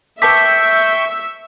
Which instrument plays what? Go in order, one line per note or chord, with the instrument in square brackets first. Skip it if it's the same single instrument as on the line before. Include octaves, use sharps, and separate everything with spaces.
[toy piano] B4 A5 D6 [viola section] E5 [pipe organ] G5 C#6 G6 [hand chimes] B6